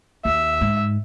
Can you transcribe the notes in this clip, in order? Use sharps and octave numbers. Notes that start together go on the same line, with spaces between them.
D#2 E5
G#2